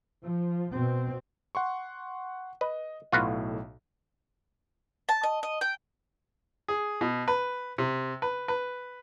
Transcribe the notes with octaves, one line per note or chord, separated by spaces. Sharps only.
F3
B2 C4
F#5 C6 C#6
B4 D#5
B1 A2 F4 F#4 B4
A5
D#5
D#5
G5
G#4
B2
B4
C3
B4
B4